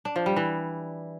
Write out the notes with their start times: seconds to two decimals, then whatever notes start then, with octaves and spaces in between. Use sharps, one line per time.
0.05 D4
0.16 F3
0.26 G3
0.36 E3